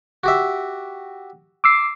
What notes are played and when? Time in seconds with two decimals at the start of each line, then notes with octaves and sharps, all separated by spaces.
0.24 F#4 G4 E5
1.64 D6 E6 C7